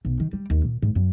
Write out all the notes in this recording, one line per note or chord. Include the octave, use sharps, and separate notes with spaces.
B1
D#3
G3
D#2
A#2
G#2
F#2